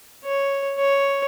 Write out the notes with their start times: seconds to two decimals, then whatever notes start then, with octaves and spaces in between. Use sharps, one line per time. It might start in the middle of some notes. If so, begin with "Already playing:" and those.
0.25 C#5
0.79 C#5